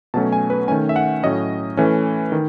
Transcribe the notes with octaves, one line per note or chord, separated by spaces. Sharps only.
B2 F#3 A3 C#4 A5
G#5
B4
D#3 A3 C#4 G#5
E5
F#5
A2 F#3 C#4 D#5
E3 A3 C#4
D#3